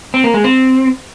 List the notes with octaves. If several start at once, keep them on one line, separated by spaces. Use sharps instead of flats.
C4
A#3
G#3
C4